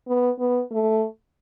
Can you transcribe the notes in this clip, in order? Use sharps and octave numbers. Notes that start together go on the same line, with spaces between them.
B3
B3
A3